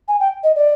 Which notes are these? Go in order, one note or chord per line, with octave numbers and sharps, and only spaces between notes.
G#5
G5
D#5
D5